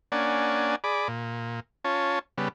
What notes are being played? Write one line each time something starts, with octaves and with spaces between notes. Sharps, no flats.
A#3 C#4 D4 D5 F#5 G#5
G#4 D5 B5 D6
A#2
C#4 F4 C#5 A5
C#3 G3 B3